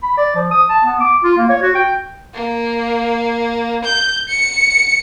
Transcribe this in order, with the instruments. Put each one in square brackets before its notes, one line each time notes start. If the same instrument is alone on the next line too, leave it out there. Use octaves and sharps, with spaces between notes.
[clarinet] B5
D5
F3
D#6
A5
B3
D6
F4
A#3
C#5
F#4
G5
[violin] A#3
G6
C#7